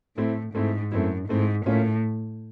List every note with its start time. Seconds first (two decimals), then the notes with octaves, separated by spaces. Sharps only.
0.17 A2 A3 C4 E4
0.54 G#2 A3 C4 E4
0.92 F#2 A3 C4 E4
1.29 G#2 A3 C4 E4
1.66 A2 A#3 C#4 F4